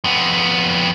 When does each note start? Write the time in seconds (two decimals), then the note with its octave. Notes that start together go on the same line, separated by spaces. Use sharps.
0.04 F2 B3